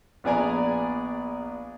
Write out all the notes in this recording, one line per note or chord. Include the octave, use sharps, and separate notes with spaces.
A#1 B3 G#4 D5 G#5 A#5